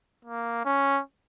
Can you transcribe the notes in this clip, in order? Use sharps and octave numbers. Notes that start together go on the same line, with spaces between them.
A#3
C#4